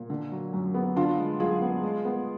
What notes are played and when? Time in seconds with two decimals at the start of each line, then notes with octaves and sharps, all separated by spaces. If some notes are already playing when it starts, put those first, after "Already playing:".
Already playing: A#2
0.10 D3
0.31 F#3
0.53 F#2
0.74 B3
0.96 D3 D4 F4
1.18 G#3
1.40 F#2 F4 G#4
1.62 B3
1.83 G#3
2.05 B3